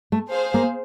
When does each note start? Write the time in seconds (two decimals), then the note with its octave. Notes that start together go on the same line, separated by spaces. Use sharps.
0.12 A3
0.30 G#4 C5 F5
0.54 A#3